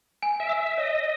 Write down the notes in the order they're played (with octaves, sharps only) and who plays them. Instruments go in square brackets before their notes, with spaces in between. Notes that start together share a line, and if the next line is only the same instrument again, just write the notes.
[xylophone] G#5
[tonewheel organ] E5
[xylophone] E6
[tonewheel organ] E5
[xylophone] C#5 [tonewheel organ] D#5